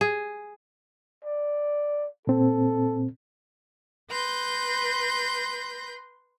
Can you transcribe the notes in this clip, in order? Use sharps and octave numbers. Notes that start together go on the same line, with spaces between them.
G#4
D5
A#2 C4 A4
B4 C6 G6 A#6